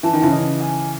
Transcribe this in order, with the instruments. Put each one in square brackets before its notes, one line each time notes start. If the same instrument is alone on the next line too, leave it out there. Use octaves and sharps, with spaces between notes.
[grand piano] E3 [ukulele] A5
[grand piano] D#3
C#3 E3
[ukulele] D#5
G#5